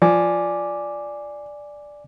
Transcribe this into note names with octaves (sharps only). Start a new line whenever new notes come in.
F3 D5 G#5 D6